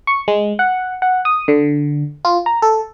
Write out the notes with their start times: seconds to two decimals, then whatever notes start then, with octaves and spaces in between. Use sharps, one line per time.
0.07 C#6
0.28 G#3
0.59 F#5
1.02 F#5
1.25 D#6
1.48 D3
2.25 F4
2.46 A#5
2.62 A4